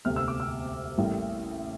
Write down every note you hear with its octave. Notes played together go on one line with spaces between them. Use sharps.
E1 D2 C3 F6
E6
D6
E6
A1 A2 G3 A#3